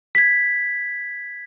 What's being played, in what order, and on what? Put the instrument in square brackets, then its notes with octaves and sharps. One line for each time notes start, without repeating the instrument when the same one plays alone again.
[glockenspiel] G#6 B6